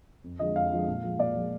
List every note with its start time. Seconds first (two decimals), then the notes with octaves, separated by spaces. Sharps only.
0.24 F2
0.39 D3 F3 G#3 D#5
0.55 F2 F5
0.72 D3 F3 G#3
0.88 A#2
1.04 F3 G#3
1.19 A#2 D5
1.35 F3 G#3